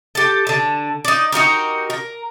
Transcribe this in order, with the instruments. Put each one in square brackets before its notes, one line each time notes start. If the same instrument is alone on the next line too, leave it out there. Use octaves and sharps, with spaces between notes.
[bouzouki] G4 A4
D3 A5
D#4 D5
D#4 F#4 G4 A#4
A#4